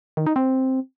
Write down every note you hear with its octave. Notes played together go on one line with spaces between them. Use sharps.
D#3
D#4
C4